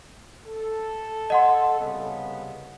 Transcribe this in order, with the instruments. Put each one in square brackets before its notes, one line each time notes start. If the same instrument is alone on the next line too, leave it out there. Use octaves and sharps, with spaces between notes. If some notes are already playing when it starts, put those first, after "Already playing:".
[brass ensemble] A4
[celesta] D#5 F#5 C6
[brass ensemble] C2 C#3 B3